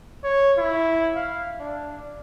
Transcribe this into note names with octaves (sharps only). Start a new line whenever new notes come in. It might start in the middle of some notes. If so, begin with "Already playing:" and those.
C#5
E4
F5
D4